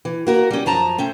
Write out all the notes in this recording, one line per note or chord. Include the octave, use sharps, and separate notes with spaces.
E3
A#3 F#4 A#4
G3 C#4
F#2 F3 A5 A#5
A3 C4 C#4